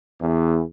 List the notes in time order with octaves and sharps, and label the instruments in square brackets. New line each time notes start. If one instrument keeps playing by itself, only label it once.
[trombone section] E2